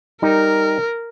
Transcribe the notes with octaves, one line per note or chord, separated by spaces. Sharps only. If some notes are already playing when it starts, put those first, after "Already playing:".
G3 D#4 A#4